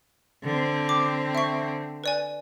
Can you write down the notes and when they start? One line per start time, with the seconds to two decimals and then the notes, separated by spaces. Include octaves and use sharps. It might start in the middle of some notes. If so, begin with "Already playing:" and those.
0.44 D3 C4
0.89 D6
1.35 E5 C#6
2.04 B4 D5 G#5